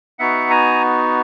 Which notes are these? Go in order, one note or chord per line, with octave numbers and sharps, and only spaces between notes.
B3 D#4 F#4 E5 F#5
G#5 A#5